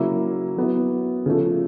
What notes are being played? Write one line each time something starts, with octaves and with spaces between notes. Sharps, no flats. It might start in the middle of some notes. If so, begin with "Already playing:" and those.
Already playing: C#3 F#3 A#3 C#4 E4
F#3 B3 E4
C#3 F3 A3